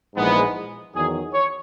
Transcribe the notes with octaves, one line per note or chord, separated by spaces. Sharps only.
A#1 G#2 E3 G#3 B3
E2 D#3 F#3 G#4
C#5